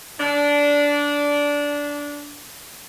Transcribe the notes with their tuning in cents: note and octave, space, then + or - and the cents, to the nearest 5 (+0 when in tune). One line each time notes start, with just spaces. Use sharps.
D4 -15